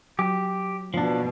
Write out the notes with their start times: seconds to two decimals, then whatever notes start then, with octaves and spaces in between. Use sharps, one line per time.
0.19 F#3 G4
0.94 B2 F3 D4